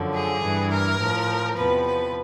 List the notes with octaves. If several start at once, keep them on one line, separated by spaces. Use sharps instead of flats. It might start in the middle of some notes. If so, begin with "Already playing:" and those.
Already playing: F#2 D3 F3
G#4
G2 E3
A#4
A2 F3
E2 C3 F3 B4
B4